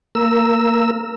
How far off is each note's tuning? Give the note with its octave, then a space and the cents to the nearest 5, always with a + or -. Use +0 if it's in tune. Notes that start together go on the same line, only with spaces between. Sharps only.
A#3 -20 A#4 +0 E6 +0